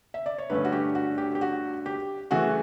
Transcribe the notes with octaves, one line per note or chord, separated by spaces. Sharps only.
E5
D5
C#5
G2 D3 A3 C#4 B4
F#4
G4
F#4
G4
G4
F#4
G4
C#3 E3 A3 F#4